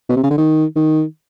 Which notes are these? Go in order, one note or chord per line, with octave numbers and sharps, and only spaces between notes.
B2
C3
C#3
D3
D#3
D#3